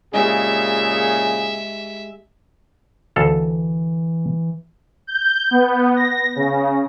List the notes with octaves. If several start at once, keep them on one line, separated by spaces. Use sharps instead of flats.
A#2 C#3 G#3 G4 G#4 E5
D2 E3 A4 F5
G6
B3
A#6
C#3